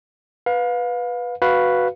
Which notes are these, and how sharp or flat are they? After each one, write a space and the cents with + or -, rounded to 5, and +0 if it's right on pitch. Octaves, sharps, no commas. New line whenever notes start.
B4 +0 F5 +30
F#4 +0 B4 +0 F5 -10